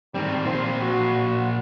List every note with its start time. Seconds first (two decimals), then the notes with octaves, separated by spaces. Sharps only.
0.15 D#3 G3 C4
0.45 A#2 C4 C5
0.81 F#4